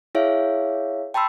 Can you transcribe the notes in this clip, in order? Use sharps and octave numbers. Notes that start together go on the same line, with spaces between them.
E4 G#4 C#5 E5 F5
G5 A5 B5 C6 E6